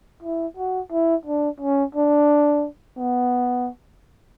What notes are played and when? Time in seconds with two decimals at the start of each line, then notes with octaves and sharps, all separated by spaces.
0.23 E4
0.57 F#4
0.92 E4
1.26 D4
1.60 C#4
1.95 D4
2.98 B3